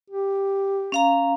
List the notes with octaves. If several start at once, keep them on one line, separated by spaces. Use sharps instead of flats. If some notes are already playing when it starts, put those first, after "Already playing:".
G4
C#4 F5 A#5